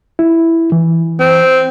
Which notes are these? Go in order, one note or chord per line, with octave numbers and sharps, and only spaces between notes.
E4
E3
C4